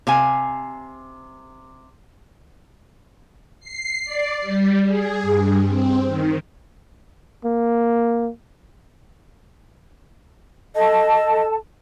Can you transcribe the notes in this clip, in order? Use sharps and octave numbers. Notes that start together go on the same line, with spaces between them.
C3 F5 G#5
C7
D5
G3
G#4
G2
C4
D#3
A#3
A4 D#5 A5